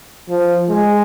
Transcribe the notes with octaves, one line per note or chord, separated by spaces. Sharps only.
F3
G#3